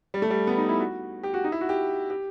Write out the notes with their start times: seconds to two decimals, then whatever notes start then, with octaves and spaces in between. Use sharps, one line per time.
0.14 G3
0.22 A3
0.30 G3
0.47 B3
0.58 D#4
0.69 E4
0.80 F#4
1.23 G4
1.34 F#4
1.44 D#4
1.52 E4
1.61 F#4
1.69 G4
2.10 G4